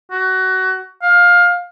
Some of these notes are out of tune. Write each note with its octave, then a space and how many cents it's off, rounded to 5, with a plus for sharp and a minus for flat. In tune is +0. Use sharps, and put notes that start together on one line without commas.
F#4 +20
F5 +20